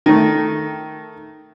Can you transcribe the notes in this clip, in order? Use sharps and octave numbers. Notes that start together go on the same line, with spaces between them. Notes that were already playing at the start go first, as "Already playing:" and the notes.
D#3 A3